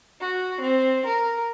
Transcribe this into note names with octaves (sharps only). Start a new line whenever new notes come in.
F#4
C4
A#4